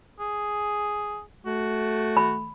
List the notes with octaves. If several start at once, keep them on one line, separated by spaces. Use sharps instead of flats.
G#4
A3 F#4
B5